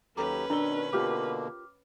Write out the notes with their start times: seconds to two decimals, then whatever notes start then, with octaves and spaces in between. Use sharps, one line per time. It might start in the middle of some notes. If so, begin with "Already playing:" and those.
0.17 D#2 F#3 C#4 G4 A4 B4 A#5 D6
0.50 B2 D#3 D4 A4 D5 A#5 G7
0.93 B2 D3 A#3 F4 G4 A#4 D6 F6